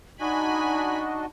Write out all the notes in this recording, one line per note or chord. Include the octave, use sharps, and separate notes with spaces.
D4 D#4 F#4 D#5 G#5 B5